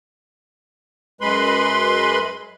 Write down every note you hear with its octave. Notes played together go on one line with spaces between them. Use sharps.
F#2 G#3 B4 B5 C6